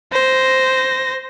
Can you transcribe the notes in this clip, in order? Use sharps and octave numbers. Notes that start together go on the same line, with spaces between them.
C5 A#6